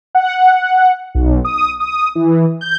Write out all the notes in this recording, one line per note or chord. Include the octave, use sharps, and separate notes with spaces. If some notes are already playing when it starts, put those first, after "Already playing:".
F#5
B1
D#6
D#6
E3
G6